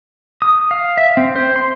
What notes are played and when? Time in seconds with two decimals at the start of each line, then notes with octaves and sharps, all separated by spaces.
0.42 D#6
0.71 F5
0.97 E5
1.17 C4
1.36 C5
1.56 C6